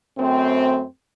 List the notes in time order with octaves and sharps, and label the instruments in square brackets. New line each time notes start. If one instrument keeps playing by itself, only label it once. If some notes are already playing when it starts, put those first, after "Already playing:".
[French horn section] F#2 A3 C4